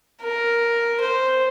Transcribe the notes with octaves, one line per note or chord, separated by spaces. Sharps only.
A#4
C5